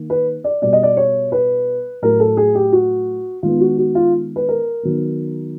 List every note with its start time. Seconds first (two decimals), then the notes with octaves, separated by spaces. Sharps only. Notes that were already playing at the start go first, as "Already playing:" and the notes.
Already playing: D#3 A#3
0.10 B4
0.44 D5
0.62 B2 G3 B3 D5
0.73 D#5
0.83 D5
0.97 C#5
1.32 B4
2.02 A2 F#3 A3 A#4
2.20 A4
2.37 G#4
2.55 G4
2.72 F#4
3.43 D#3 G#3 B3 F4
3.61 F#4
3.78 F#4
3.95 F4
4.36 B4
4.49 A#4
4.83 D#3 F#3 B3